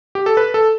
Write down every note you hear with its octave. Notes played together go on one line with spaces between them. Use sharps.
G4
A4
B4
A4